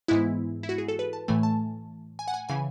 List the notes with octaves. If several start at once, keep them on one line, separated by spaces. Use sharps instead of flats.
G#2 E3 G#3 B3 E4
E4
F#4
G#4
A4
B4
A5
A2 E3 A3 G#5
A5
G#5
F#5
G#5
C#3 E3 G#5